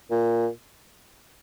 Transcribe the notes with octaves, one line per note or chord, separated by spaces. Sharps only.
A#2